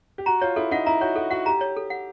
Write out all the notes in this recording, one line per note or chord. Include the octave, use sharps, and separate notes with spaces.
G4
F#4 A#5
F4 C#5
E4 A4
D#4 F#5
E4 A#5
F#4 C#5
F#4 A4
F#4 F#5
G4 A#5
C#5
A4
F#5